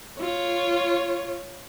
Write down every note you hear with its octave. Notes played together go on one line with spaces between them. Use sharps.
F4 C#5